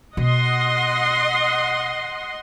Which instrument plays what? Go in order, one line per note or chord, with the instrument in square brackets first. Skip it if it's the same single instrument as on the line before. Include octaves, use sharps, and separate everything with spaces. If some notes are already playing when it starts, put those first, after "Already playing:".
[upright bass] B2 [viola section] D#5 F#5 C6